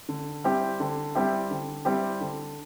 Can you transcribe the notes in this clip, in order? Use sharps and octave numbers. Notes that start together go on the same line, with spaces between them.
D3
G3 C4 E4 G4
D3
G3 C4 E4 G4
D3
G3 C4 E4 G4
D3